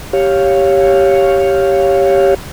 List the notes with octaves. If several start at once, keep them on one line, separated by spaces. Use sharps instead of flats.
G4 C#5 F5